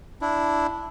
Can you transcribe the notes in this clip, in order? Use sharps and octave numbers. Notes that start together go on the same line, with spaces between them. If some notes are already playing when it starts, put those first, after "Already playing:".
D4 E4